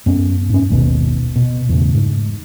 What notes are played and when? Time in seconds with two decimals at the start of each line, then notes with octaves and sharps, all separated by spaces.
0.06 F#2 B3 C#4
0.50 G#2 C#4
0.70 G#1 D#2 B2
1.36 B2
1.69 E2 A2 C#3
1.95 G#2